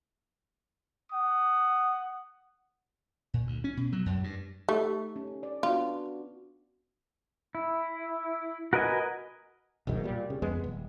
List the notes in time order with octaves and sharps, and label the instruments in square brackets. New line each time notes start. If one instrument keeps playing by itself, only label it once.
[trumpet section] F#5 D#6
[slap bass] A#2
D2
C#4
B2
F#3
F#2
G2
[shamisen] A3 [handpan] D#4 A4 [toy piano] G4
[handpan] C#4
D5
[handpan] B3 D4 F#4 [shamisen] F4
[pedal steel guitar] E4
F#4 A#4 B4 D#5 G#5
[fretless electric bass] E1 B1 G#2 D#3
A#2 G3
C#3
F2 G#3 B3
D#1